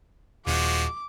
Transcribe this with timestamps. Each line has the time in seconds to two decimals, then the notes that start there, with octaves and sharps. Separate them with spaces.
0.47 D#1 F3 G#3 F#4 D6